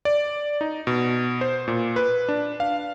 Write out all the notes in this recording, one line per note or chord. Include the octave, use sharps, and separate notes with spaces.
D5
D#4
B2
C5
A#2
B4
D4
F5